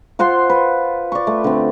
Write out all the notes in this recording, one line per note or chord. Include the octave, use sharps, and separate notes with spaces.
F4 C5 F#5 C6
B4
D5 C#6
A3
D3 C4